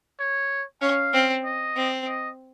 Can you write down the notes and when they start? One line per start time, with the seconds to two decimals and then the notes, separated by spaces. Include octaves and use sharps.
0.20 C#5
0.81 C#4 F5
1.13 C4
1.44 D#5
1.76 C4
2.07 D#5